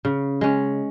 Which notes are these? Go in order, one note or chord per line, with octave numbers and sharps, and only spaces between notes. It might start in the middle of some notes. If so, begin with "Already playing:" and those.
C#3
G#3 C#4